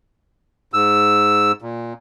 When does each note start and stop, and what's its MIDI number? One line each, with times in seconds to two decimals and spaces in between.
0.73 1.52 44
0.73 1.52 88
1.62 1.93 46